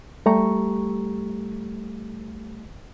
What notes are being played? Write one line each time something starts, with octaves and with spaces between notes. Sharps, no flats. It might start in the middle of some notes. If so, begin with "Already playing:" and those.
G3 A3 G4 A#5 C#6